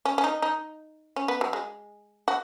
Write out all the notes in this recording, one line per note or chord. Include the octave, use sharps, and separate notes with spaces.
C#4
C#4
D#4
D#4
C#4
B3
F#3
G#3
F#4